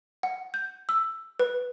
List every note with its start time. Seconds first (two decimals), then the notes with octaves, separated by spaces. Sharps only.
0.23 F#5
0.54 G6
0.89 E6
1.39 B4